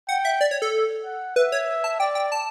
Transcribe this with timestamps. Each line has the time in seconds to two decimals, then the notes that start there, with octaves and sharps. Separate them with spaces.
0.09 F#5 G5
0.25 E5
0.41 D5
0.51 C#5
0.62 A4
1.05 F#5
1.36 B4 E5
1.52 C#5
1.84 A5
2.00 D5 G5
2.15 G5
2.32 A5